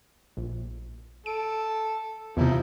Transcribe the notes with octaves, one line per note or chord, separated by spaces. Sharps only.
A#1
A4 D7
E2 C3 F3 D#4 E4